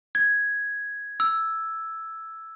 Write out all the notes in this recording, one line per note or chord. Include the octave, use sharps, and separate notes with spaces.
G#6
E6